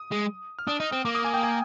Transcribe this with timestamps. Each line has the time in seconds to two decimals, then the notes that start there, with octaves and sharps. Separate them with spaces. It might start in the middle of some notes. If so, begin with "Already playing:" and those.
Already playing: D#6
0.11 G#3
0.59 F6
0.67 D4 D#6
0.80 D#4
0.92 C4
1.05 A#3 D6
1.15 D#6
1.24 G#5
1.34 G5
1.43 G#5